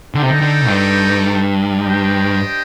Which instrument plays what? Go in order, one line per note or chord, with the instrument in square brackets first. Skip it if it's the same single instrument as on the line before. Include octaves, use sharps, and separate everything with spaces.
[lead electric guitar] D3 [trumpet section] D#4 A4 D#5 G5
[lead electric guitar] C3
D3
D3
G2
[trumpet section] D4 G4 C5 D#5 G5